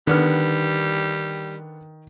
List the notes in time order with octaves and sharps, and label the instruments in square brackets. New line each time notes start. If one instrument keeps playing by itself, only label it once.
[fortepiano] D3 B3 F6 [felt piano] D#3 [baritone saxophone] G3